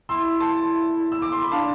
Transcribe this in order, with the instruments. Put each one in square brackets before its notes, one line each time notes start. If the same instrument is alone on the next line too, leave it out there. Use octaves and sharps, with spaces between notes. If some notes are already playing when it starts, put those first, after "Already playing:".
[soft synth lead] E4 [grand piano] C6 E6
[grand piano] A5 C6
E6
D6
C6
B5
[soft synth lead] D4 [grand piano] F5 A5